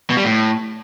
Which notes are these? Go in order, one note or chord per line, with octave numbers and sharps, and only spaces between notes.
B2
G3
A2